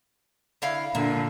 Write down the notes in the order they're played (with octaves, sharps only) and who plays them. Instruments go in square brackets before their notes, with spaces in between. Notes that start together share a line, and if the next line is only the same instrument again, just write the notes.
[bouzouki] D3 E4 F5
[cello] A#2 D3 [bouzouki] A#3